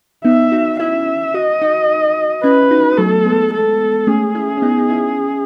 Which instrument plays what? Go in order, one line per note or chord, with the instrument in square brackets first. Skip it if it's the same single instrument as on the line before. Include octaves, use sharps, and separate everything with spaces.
[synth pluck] B3 D#4 [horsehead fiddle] E5
[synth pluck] D#4 F#4
[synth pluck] C#4 E4 [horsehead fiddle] E5
[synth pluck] F#4 [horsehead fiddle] D#5
[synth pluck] D#4 F#4
[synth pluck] C#4 E4 [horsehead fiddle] B4
[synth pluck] D#4 F#4
B3
[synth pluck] F#3 A3 [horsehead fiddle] A4
[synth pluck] G#3 B3
[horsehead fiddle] A4
[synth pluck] A3 C#4 [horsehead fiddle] G#4
[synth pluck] C#4 E4
C#4
B3 D#4
D#4
C#4 E4